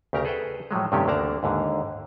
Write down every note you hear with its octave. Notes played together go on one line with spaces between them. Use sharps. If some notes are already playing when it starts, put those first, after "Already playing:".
D2 C#3 G4 A#4 A#5
G#4 A4 B4 C5 G5
A2 F3 F#3 G#3
G2 C3 D#3 A3 C#4 G4
D2 D3 A#3 D5 A5 A#5
D#2 G#2 D3